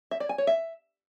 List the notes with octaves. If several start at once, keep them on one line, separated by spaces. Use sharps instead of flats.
E5
D5
G#5
C#5
E5